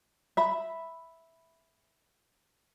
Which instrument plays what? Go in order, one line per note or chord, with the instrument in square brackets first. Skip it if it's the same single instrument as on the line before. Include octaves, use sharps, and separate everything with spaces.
[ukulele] E5 B5